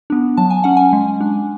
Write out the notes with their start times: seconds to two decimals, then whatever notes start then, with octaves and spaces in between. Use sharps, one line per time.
0.10 B3 D4
0.37 F#3 A5
0.50 G#5
0.64 C#4 F#5
0.77 G#5
0.93 G#3
1.21 D4